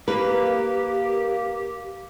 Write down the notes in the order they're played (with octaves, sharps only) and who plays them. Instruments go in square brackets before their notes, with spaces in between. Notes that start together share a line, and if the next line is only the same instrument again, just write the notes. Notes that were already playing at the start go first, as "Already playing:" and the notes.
[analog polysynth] A#3 [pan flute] G4 [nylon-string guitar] B4